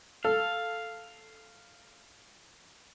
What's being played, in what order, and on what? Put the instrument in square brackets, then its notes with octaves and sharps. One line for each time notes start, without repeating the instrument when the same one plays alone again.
[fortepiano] A4 [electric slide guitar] F5